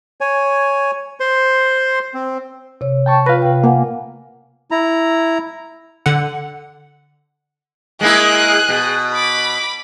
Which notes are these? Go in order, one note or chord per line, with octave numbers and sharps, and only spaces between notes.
C#5 G#5
C5 C6
C4
C3 C#5
G5 A5 C#6
F4 B4 F5 A#6
C3 G5
A#3 F5 F#5 G#5
E4 A#5
D3 F#5
G#3 A#3 E4 G#4 F#6
B2
B5 D6